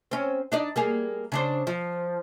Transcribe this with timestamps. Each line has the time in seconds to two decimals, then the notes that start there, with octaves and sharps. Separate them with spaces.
0.11 C4 C#4
0.52 D4 D#4 D5
0.76 G3 A#3 G#4
1.32 C#3 D4 C5
1.67 F3